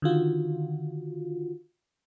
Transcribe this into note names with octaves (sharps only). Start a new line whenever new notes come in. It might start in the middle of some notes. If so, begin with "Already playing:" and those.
D3 D#3 F4 F#4